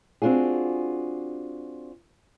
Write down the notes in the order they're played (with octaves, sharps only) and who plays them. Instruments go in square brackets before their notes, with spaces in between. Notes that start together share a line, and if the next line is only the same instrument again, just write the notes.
[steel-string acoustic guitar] C4 D4 F4 F#4 G#4